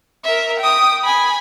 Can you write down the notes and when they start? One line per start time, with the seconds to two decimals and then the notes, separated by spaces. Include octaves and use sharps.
0.25 A#4 E5
0.60 G5 D#6
1.04 G#5 B5